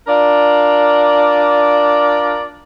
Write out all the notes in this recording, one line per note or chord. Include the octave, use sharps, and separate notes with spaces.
D4 F4 A#4 D5